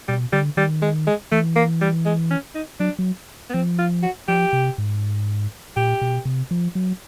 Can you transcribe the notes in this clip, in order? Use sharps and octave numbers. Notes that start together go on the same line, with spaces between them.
B2 G3
D3 G3
D#3 G3
G#3
G#3
E3 A3
A#3
G3
G#3
C#4
D#4
F#3 D4
F#3
B3
F3 C4
F4
F#4
F3 G4
C3
G#2
A#2 G4
B2
C3
F3
F#3